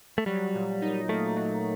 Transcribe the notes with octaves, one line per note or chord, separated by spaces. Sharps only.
A3
F#3 G3
A#2
D#4
A3 A#3
F#3